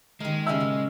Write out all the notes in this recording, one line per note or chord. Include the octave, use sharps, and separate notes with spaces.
D#3 G#3 A#3
C#3 C#4 F#4 E5 E6
A#2